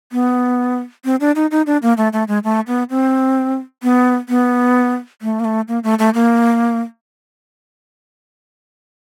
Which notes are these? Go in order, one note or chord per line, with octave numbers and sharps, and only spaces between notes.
B3
C4
D4
D#4
D#4
D4
A#3
A3
A3
G#3
A3
B3
C4
B3
B3
A3
A#3
A3
A#3
A3
A3
A#3